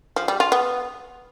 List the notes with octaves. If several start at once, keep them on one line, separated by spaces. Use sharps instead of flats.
F3
G3
F4
B3